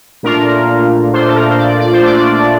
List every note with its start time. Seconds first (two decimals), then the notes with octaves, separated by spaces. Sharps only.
0.23 A#2 A3 D4 F4 A#4
1.13 A#2 A3 D4 F4 C5
1.28 A4
1.35 A#4
1.50 C5
1.58 D5
1.80 D5
1.93 C5
2.02 A#2 A3 D4 F4 D5